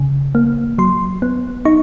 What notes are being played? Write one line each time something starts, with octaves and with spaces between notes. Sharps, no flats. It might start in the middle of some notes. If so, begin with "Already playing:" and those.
Already playing: C#3
A#3
F#3 C6
B3
D#4 C#6